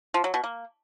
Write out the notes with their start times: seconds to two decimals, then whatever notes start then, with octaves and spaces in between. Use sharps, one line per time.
0.14 F3
0.24 F#3
0.34 B2
0.44 A#3